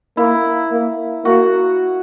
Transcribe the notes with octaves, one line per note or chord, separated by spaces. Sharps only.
A#3 E4
A#3
A#3 F#4